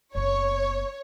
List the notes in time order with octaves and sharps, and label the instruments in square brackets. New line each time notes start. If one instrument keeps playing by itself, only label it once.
[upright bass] F#1 B3 [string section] C#5